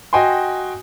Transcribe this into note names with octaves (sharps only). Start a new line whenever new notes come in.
F#4 D#5 G5 G#5 C6